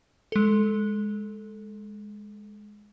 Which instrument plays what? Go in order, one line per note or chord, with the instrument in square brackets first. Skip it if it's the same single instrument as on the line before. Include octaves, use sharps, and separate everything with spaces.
[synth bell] G#3 A4